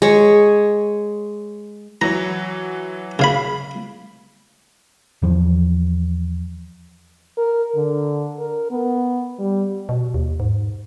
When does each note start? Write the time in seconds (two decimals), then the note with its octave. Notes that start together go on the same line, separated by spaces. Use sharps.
0.02 G#3 C#5
2.01 E3 F#3 C#5 A#5
3.19 C#3 F5 B5
5.22 E2 E3 F3
7.38 A#4
7.76 D3
8.40 A#4
8.71 B3
9.39 G3
9.89 B2
10.14 D#2
10.40 G#2